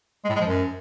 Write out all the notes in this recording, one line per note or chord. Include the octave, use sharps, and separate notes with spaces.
G#3
A2
G#3
F3
F#2